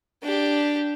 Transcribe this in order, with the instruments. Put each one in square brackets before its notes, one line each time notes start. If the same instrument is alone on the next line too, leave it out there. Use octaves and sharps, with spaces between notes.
[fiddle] D4 G4